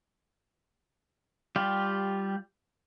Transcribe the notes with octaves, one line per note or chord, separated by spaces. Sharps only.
G3 F4 G4